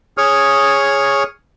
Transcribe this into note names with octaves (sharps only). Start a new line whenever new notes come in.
G#4 C#5 C#6 D#6 F6